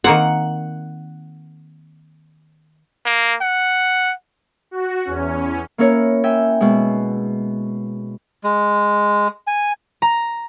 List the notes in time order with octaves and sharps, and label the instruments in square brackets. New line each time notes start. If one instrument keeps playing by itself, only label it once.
[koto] D#3 A#3 C4 [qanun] F#5
[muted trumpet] A#3
F#5
[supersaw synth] F#4
E2 C#4
[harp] A#3 C#4 E4 A#4 C#5
E5 G5 G#5
B2 G#3
[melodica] G#3
G#5
[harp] A#5